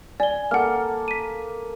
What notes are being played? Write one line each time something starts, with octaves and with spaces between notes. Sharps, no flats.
D5 G#5 G7
A#3 A4 F#5 F6
B6 D#7